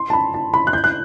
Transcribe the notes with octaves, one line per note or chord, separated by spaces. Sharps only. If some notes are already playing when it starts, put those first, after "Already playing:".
Already playing: C6
A5
B5
A5
B5
F#6
G6
F#6